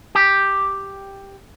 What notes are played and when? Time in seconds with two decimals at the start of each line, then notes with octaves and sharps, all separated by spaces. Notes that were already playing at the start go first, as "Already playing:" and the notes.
0.15 G4